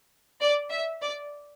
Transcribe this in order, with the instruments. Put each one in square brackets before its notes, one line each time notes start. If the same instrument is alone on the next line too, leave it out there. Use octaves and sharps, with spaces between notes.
[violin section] D5
E5
D5